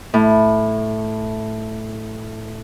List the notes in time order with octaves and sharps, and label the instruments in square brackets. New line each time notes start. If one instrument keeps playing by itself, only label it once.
[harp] A2